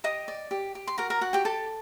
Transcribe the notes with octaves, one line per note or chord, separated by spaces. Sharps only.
G4 D#5 D#6
D5
G4
G4
C6
F#4 A#4 A#5
A#4 A#5
F#4 F#5
G4 G5
G4 A4 A5